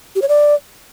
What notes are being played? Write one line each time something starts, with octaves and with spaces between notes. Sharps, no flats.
G4
C#5
D5